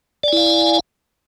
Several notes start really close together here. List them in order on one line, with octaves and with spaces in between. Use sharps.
D5 G#5 E4 F5